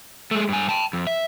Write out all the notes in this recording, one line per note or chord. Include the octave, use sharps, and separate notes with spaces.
G#3 A3
G2 G#5
G5 A5
F2
E5